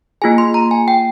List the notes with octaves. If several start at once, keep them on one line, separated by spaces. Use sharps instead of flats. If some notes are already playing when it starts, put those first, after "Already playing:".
A#3 F4 G#4 G#5
C6
A#5
G#5
G5